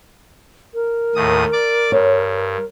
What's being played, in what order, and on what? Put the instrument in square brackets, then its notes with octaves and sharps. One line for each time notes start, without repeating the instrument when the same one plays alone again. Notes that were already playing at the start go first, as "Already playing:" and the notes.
[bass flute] A#4
[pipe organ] D#2 A2 D#6
D5 D6
[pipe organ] G2 [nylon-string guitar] C#5